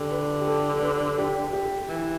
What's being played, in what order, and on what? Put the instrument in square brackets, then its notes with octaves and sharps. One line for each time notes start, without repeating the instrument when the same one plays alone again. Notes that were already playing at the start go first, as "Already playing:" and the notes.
Already playing: [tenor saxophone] D3 [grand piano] G4
[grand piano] B4
G4
A4
B4
G4
G4
[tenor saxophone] E3